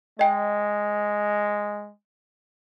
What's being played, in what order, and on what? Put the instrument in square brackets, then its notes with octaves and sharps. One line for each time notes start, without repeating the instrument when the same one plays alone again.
[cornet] G#3 [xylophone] D#5 G5